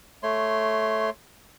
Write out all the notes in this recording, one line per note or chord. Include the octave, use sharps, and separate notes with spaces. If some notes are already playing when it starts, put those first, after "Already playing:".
A3 C#5 C6